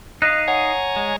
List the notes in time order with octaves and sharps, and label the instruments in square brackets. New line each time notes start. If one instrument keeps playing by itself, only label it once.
[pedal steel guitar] D#4 D#5 F5 [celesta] F#6 A#6
[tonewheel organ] C#5 G#5 A#5 [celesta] F#5
[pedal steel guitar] G#3